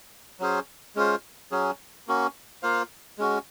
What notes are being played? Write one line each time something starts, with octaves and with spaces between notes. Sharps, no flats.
F#3 C#4 G#4 C5
G#3 C#4 F4 C5
F#3 C#4 G#4
A#3 C#4 F#4
A#3 F4 C5 F5
G#3 C#4 F#4